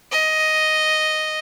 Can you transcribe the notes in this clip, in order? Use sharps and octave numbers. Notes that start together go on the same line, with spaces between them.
D#5